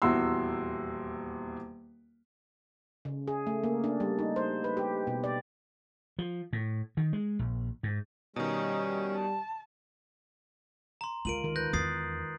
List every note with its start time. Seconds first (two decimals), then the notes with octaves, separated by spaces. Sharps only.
0.02 D#1 E2 E4 F#4 C6 E6
3.05 C#3
3.28 G#4
3.47 A3
3.64 A#3
3.84 D4
4.00 G3
4.19 D#4
4.36 C5
4.64 B4
4.77 G4
5.07 B2
5.24 D5
6.19 F3
6.53 A2
6.97 D#3
7.13 G#3
7.39 A#1
7.83 G#2
8.36 B2 D#3 G3 C#4 D#4
9.15 A5
11.01 A#5 C6
11.25 D2 G#3 F4 A#4 D7 D#7 F#7
11.44 D#3 A#4
11.56 B4 F#6 G6 A#6
11.73 E2 D#6 A6 C7